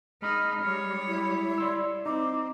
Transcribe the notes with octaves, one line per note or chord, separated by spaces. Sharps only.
G#3 D#4 B5 D#6 F6
G3 C#5
E4
D5 C6 E6
C4 D#4 D6